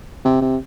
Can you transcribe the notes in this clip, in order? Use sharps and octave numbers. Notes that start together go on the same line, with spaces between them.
C3
C3